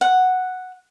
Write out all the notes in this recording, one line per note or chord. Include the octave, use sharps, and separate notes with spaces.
F#5